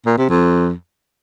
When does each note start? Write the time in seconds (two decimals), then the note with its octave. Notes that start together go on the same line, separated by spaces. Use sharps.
0.06 A#2
0.17 C3
0.29 F2